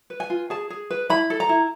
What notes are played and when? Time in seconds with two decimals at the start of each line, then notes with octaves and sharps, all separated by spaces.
0.10 B4
0.20 G#5
0.30 F4
0.50 G#4 A5
0.70 G#4
0.91 B4
1.10 E4 B5
1.30 A4
1.40 A#5
1.49 E4